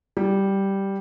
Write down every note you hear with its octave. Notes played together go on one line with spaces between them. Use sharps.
G3